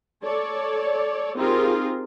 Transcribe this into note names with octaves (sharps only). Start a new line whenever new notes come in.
A4 C#5 D5
C4 D#4 F4 G4 G#4 A#4